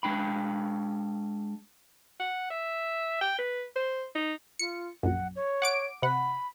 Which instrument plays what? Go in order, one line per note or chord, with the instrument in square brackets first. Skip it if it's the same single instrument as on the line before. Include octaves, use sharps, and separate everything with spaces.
[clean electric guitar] G#3 D4 G5 B5
[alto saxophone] F#5
E5
G5
B4
C5
D#4
[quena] F4 [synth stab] C#7
[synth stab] A#1 F#2 [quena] F#5
[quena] C#5
[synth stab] F#5 D6 D7
[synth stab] C3 F#5 [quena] B5